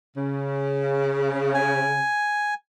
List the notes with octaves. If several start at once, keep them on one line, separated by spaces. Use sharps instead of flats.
C#3
G#5